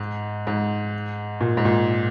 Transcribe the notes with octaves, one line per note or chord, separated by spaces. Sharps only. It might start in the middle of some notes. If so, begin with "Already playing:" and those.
Already playing: G#2
G#2
A#2
G#2
A#2